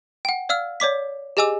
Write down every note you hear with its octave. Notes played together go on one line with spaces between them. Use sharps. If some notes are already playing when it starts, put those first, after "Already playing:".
F#5 G5
D5 F5 E6 F6
C#5 D5 D6 B6
G4 G#4 D#5 G#5 D6 E6